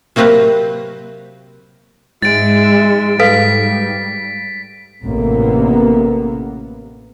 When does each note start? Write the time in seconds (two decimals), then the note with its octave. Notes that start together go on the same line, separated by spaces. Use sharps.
0.16 C3 F#3 A#3 C4 B4 A#5
2.22 G#2 G#3 E5 A6 D7
3.20 G3 A4 B4 F5 B6
5.04 A1 C3 A#3 B3